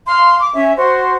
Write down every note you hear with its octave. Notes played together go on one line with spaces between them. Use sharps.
F5 C6
D6
C#4 E5
F#4 C5